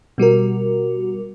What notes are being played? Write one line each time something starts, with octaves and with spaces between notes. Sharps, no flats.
B2 G3 F#4 A#4